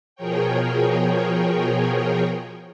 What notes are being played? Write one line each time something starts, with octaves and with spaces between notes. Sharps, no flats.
B2 F3 G#4 A#4 C#5 G5